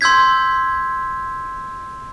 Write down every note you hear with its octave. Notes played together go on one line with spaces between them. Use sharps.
C6 E6 G6 G#6 B6